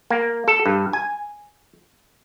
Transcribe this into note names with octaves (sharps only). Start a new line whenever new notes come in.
A#3
A4
G2
G#5